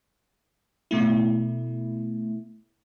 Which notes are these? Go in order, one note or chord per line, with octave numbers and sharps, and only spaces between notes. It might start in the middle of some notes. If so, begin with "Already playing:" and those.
B2 A3 E4